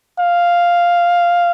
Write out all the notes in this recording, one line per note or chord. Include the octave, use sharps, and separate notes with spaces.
F5